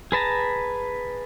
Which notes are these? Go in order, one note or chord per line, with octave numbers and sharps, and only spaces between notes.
G#4 B4 A5 A#5